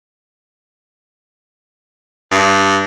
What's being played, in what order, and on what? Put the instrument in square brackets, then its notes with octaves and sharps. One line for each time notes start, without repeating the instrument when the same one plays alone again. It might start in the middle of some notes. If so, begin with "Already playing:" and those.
[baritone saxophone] G2